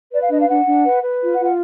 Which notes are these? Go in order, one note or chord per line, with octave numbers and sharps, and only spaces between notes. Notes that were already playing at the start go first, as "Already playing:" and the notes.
B4 D5
F5
D4 D#5
F5
D4 F#5
D4
B4
B4
F4
F#5
F4
F#5